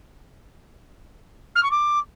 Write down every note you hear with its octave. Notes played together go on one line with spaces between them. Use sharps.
F6
C#6
D6